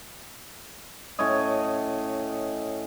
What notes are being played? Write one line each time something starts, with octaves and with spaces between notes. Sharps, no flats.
A2 C#4 C#5 D#5